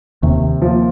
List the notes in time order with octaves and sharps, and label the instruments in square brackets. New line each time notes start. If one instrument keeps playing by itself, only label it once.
[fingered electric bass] D#2 D#3 [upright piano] C3
[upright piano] F3 A#3